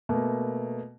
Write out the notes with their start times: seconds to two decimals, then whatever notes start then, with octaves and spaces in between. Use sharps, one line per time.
0.09 B2 A3 A#3